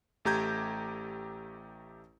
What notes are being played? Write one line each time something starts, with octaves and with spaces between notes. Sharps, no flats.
A1 A3 G4 A#5 G6 G#6